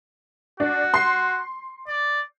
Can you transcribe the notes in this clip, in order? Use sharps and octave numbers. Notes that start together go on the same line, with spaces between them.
D4 F#4
C6 C7
D5